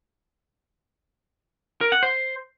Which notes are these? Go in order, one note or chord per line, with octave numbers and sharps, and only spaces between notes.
A#4
F#5
C5